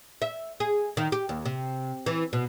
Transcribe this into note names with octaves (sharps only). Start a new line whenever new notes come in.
E5
G#4
D#3
G4
D#2
C3
E3
B2